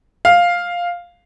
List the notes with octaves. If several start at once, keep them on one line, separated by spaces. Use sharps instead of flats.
F5